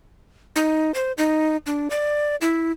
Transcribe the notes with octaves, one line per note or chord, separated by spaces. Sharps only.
D#4
C5
D#4
D4
D5
E4